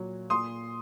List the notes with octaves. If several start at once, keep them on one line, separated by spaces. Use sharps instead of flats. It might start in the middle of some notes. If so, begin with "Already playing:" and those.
Already playing: A#2 F#3
A#2 C6 D#6